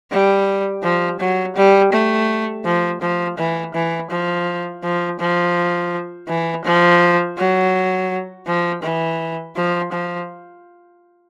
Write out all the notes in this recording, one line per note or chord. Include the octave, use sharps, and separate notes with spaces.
G3
F3
F#3
G3
A3
F3
F3
E3
E3
F3
F3
F3
E3
F3
F#3
F3
E3
F3
F3